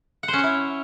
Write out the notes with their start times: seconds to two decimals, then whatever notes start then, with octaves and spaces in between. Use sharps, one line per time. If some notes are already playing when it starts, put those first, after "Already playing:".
0.23 F#5
0.28 C5
0.33 C#4
0.38 C#5
0.43 E4